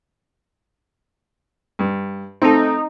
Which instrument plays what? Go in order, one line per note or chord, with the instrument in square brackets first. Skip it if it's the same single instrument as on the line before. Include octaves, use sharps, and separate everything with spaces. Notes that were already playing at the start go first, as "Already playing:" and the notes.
[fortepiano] G2
[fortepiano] A3 C4 [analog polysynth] D#4